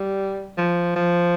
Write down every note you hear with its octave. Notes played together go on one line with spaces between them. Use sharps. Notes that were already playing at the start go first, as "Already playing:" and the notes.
Already playing: G3
F3
F3